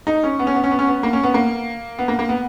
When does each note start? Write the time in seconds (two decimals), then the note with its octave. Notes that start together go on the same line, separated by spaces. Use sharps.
0.07 D#4
0.23 C#4
0.39 B3
0.47 C#4
0.55 B3
0.64 C#4
0.71 B3
0.79 C#4
0.87 B3
1.03 A#3
1.13 C#4
1.23 B3
1.34 A#3
1.98 B3
2.08 A#3
2.19 A#3
2.29 B3